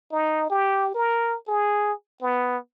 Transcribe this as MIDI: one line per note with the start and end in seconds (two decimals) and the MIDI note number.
0.12 0.47 63
0.50 0.93 67
0.94 1.36 70
1.48 1.93 68
2.22 2.58 59